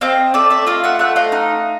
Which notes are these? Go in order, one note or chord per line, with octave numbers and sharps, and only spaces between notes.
C4 D#5 F5
A3 D5 E5
D5 E5
F4 D#5 F5
E5 F#5
A3 E5 F#5
D#5 F5
D#4